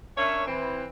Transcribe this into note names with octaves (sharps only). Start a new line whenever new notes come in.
C#4 D4 A#4 C#5 E5
E3 C4